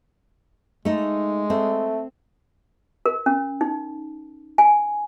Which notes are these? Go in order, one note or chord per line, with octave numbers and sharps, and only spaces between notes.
G#3 A3 D#4
A3 C4
A#4
C#4
D#4
G#5